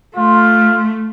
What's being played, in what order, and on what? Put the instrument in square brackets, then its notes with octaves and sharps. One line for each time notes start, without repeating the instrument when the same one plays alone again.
[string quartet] A3 [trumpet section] F4